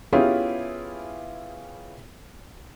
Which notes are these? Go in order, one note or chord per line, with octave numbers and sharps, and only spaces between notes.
B3 C#4 E4 F4 G4 G#4